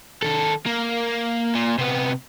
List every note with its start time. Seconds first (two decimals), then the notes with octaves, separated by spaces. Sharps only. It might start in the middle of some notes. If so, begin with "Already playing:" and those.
0.22 D#3 A4
0.66 A#3
1.55 A#2
1.78 C3 B3